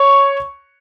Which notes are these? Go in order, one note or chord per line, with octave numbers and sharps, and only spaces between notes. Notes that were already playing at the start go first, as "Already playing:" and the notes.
Already playing: C#5 C#6